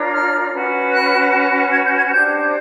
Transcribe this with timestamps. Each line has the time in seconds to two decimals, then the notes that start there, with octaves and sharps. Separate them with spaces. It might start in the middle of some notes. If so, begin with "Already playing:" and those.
Already playing: D4 F4 A#4 C#5
0.13 F6
0.53 C#4 F#4 B4
0.93 F#6
1.72 G#6
1.84 G6
1.98 G#6
2.11 D4 G4 C5 G6